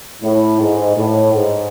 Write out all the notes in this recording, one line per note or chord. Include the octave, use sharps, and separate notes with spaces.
A2
G#2
A2
G#2